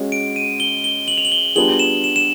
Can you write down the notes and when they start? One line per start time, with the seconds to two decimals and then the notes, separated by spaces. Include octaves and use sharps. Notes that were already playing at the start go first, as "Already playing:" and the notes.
Already playing: G#3 C#4 F#4 D#5
0.12 D7
0.36 D#7
0.60 G7
0.84 G7
1.08 F#7
1.18 F7
1.25 F#7
1.32 G7
1.56 G3 B3 D4 F4 G#4 F#7
1.79 E7
2.04 E7
2.16 E7